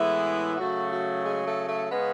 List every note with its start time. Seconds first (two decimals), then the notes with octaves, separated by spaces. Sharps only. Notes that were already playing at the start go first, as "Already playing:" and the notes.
Already playing: A2 E3 G#3 B3 E4 G#4
0.57 C#3 F#3 A3 F#4
0.91 F#4
1.25 G#3 G#4
1.46 A3 A4
1.68 A3 A4
1.91 C#3 G#3 B3 C#4 B4